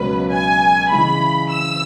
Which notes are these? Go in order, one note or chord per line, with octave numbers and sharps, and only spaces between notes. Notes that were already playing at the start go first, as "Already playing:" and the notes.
Already playing: C#2 B2 F#3 C#4 B4
G#5
C#3 E3 G#3 E4 B5
E6